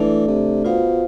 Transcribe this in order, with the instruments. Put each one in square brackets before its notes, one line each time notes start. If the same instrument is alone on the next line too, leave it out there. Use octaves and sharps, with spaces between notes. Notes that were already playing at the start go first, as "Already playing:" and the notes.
Already playing: [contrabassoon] E3 [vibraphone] A3 D4 A4 D5
[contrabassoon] C3
[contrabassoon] B2 [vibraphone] F4 C5 F5